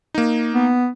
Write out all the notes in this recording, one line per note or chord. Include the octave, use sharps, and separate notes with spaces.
A#3 D#4
B3